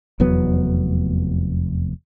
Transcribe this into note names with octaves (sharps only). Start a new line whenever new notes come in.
F1 E2 F#3 B3